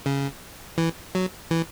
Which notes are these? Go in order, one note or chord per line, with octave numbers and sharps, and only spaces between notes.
C#3
E3
F#3
E3